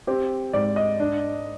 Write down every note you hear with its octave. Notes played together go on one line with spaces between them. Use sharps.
C4 G4
G#2 D5
D#5
D4